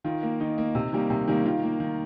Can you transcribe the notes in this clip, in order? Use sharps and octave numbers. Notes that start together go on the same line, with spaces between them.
D#3 F4
A#3
D#3 D#4
A#3
C3
D#3 G3 A#3
C3
D#3 G3 A#3
D#3 F4
A#3
D#3